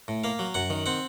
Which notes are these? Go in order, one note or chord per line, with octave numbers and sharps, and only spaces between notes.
A2
A#3 F5
F#3
F#2 F#5
D#3
C4 F#5